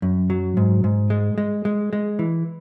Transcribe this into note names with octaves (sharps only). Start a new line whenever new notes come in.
F#2
F#3
G#2
G#2
G#3
G#3
G#3
G#3
E3